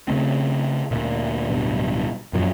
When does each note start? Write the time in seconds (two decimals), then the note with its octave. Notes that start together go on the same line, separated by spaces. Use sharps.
0.08 C#3 F#3 A3 C4
0.91 D2 A#2
1.50 D1 G2 B2
2.33 F#2 A#2 F3 F#3